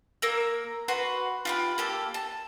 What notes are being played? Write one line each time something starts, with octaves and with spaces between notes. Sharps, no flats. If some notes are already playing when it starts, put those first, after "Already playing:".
A#3 A#4 E6
F#4 B4 C6
F4 G4 B4
A#3 G4 A4
A5